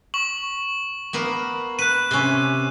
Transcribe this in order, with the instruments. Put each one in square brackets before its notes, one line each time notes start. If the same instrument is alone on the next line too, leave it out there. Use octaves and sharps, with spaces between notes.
[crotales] C#6 F#7
[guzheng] A#3 B3 A#4
[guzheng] B4 [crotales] F#6 D#7
[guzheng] C3 C#4